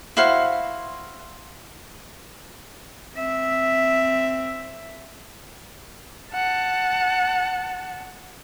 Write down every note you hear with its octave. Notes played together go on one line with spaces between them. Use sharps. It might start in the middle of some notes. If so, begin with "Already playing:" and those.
E4 F#4 C5 F5
C4 E5
F#5 A5